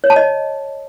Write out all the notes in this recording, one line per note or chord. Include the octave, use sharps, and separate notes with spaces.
C#5
A5
D#5